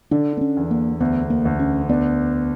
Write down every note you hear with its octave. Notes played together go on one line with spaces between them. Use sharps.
D3 D4
B3
C#4
E2
A#3
D2 B3
A#3
D2
C#4
B3 D4